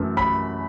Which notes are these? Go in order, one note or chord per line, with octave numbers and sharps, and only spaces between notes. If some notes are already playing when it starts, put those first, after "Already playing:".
Already playing: F#2 E3 A3
B5